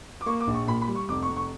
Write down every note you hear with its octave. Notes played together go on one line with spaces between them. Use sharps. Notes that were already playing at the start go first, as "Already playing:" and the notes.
D6
A#3 C#6
D6
A#1
C#6
A#2 B5
B5
G3
C#6
F1 D6
C#6
F1
C#6